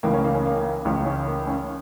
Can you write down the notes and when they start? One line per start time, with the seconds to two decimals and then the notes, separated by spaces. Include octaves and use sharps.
0.03 C#2 C#3 E3 A#3
0.13 C#4
0.24 A#3
0.35 C#4
0.46 A#3
0.85 C#2 C#3 E3 C#4
1.06 C#4
1.27 A#3
1.47 C#4